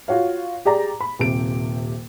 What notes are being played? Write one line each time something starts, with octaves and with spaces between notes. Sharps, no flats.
F4 F#4 C#5 F5
G4 G#4 D5 A#5
B5
D#1 C3 D7